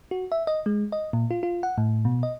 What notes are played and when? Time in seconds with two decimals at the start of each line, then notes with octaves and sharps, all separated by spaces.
0.11 F#4
0.32 E5
0.47 D#5
0.66 G#3
0.92 D#5
1.13 A#2
1.31 F4
1.43 F4
1.63 F#5
1.78 A2
2.05 B2
2.23 D#5